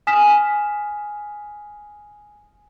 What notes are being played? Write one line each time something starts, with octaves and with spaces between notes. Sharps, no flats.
G#5 D#6 F6 B6 E7